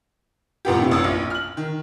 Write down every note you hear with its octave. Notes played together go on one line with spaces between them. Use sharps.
G#1 A#2 B3 G4
A2 C3
A1 D#6 E6
A#1
F6 F#7
D#3